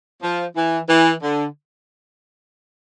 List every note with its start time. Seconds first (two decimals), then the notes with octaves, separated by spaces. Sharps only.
0.23 F3
0.56 E3
0.89 E3
1.23 D3